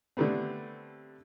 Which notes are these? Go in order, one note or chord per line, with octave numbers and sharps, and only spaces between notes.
D3 G3 A3 B3 C4